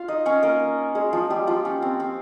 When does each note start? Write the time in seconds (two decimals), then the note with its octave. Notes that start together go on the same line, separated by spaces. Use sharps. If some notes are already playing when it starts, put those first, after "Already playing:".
Already playing: F4 F5
0.08 D#4 D#5
0.26 C#4 C#5
0.43 A#3 A#4
0.95 G#3 G#4
1.13 F3 F4
1.30 G3 G4
1.47 F3 F4
1.65 C#4
1.82 C4
2.00 C4